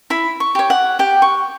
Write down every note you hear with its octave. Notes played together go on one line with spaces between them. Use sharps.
E4 B5
C#6
G4 C#5
F#5
G4 G5
C#6